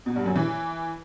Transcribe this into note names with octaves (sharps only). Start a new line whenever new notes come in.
B2
G2
F#2
E3